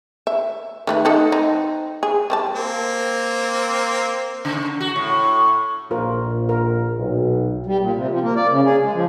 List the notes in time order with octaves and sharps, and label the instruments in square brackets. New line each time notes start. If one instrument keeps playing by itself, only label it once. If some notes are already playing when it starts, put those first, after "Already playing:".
[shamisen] E5
D#3 A3 B4
D#4 A4 F#5
C4 D#4
G#4
G3 C5 A5
[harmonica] A#3 C4
[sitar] C#3
F#4
A2
[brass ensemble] A#1 A#2 [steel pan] F4 A#4 C5
[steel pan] A#4
[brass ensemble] B1
[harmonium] G3
A#2
C3
F3
A#3
D5
C#3
G#4
G#3
F3